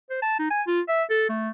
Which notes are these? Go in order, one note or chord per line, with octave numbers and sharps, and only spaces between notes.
C5
A5
D#4
G#5
F4
E5
A4
A3